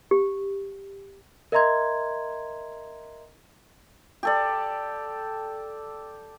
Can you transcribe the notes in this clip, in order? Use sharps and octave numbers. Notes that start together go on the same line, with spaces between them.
G4
A#4 D#5 E5 A#5 C6 G#6
G4 A4 D5